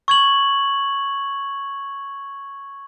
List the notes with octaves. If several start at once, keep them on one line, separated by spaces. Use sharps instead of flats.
C#6 G#6 F#7